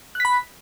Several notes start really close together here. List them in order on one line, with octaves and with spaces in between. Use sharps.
F#6 B6 B5